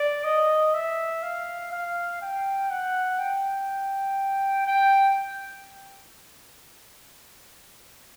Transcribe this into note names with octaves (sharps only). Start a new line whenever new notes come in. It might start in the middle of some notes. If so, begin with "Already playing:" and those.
Already playing: D5
D#5
E5
F5
F5
G5
F#5
G5
G5